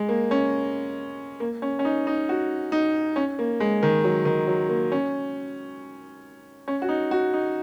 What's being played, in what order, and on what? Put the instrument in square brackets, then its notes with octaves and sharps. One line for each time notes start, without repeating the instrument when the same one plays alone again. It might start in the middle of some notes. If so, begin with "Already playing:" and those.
Already playing: [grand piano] G#3
A#3
C#4
A#3
C#4
C#4
D#4
D#4
F#4
D#4
C#4
A#3
G#3
D#3
F#3
D#3
F#3
A#3
C#4
C#4
F#4
D#4
F#4
D#4